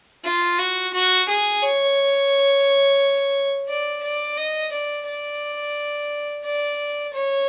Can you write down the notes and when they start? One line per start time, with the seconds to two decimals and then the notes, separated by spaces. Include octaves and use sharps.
0.24 F4
0.58 F#4
0.93 F#4
1.28 G#4
1.62 C#5
3.68 D5
4.03 D5
4.37 D#5
4.72 D5
5.06 D5
6.44 D5
7.12 C#5